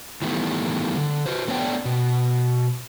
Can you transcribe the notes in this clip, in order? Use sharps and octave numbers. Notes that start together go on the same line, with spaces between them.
D#3 E3 G3 A3 B3
D3
F#4 B4 C5
A3 B3 D4 C#5 D5 G5
B2